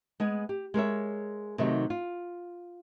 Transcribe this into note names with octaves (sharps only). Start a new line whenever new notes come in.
G#3 B3 G#5
G4
G#3 A#4 C#5 E5
C3 D#3 F#3 A3 D#4 G4
F4